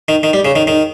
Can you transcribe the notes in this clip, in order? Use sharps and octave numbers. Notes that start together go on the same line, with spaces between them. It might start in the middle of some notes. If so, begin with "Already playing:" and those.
D#3
D#3
G3
C#3
D#3
D#3